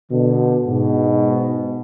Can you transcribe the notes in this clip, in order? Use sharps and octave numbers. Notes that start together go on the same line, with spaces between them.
B2 D3
G#2 B2